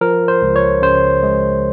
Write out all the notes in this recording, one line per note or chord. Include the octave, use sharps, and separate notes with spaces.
F3 A#4
C5
C#2
C#5
C#3 C5
G#3